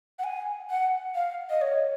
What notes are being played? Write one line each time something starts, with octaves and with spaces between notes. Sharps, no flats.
F#5
G#5
F#5
F5
D#5
C#5